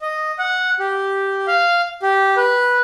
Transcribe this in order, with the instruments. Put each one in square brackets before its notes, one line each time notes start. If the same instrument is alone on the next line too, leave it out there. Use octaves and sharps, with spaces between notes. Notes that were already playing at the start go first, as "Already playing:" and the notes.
[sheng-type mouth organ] D#5
F#5
G4
F5
G4
B4